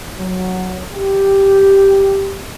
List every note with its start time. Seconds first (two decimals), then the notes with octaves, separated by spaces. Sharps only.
0.18 F#3
0.94 G4